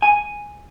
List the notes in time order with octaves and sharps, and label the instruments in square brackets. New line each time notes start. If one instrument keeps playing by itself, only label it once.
[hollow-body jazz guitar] G#5